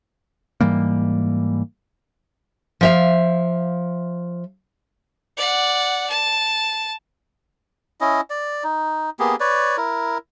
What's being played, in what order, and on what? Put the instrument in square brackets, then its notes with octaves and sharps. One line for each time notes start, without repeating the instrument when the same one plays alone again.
[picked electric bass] G#2 E3 G3 A#3
[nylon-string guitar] F3 E5 F5
[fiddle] D5 F#5
A5
[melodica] C#4 E4 D#5
D5
D#4
A#3 B3 G4 G#4
B4 C#5 D5
E4 A#4